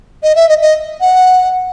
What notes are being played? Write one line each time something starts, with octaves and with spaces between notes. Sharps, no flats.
D#5
E5
D#5
D#5
F#5